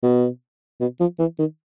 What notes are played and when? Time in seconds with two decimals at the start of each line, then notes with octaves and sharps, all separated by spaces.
0.03 B2
0.80 B2
1.00 F3
1.19 E3
1.39 D#3